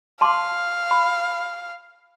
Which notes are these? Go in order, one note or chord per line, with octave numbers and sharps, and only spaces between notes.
F5 A5 C6 D6
B5